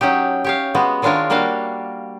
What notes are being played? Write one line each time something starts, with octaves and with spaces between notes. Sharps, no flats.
F#3 C#4 D#4 G4
G4 C#5 F5
G#3 B3 F#4
D#3 G#3 D4 F4 A#4 C#5
G3 A#3 D4 F#4 F5